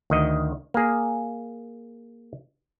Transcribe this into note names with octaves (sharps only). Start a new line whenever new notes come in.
D2 D#3 D#5
A#3 G#4